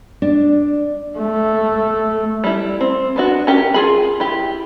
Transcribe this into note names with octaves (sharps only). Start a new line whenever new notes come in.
D4
A3
G3 E4
C4
B3 D4 F#4
C#4 G4 A#4 C5 G5
F4 G#4 B5
E4 G4